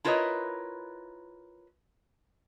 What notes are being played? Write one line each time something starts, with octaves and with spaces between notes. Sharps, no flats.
E4 F4 A#4 B4 C#5 D#5